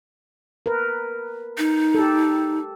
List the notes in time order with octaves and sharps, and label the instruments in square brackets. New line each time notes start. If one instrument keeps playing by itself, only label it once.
[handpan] A#4 B4
[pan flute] D#4
[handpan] G4 A4